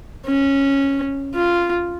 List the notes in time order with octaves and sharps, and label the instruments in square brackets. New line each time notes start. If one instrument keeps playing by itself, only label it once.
[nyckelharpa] C#4
F4